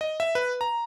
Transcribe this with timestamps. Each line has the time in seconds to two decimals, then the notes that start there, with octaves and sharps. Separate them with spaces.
0.01 D#5
0.20 E5
0.35 B4
0.61 A#5